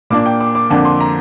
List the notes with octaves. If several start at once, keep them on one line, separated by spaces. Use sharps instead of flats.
A#2 A#3 D4 D6
G5
D6
D6
F2 D3 A#3 D4 D6
C6
A#5